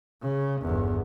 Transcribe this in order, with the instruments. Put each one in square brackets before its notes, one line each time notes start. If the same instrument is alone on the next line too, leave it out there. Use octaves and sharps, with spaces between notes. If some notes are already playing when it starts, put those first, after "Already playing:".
[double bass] C#3
G1 E2